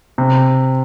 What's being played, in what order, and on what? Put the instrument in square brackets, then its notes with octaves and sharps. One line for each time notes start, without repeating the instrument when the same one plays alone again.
[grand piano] C3